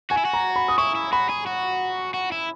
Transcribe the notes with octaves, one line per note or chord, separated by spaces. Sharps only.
F#4 G#5
E4
F#4
A#5
B5
D#6
E4 C#6
E4
F#4 B5
G#4
F#4
F#4
E4